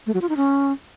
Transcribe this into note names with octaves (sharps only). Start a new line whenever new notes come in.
A3
F#3
F4
D#4
C#4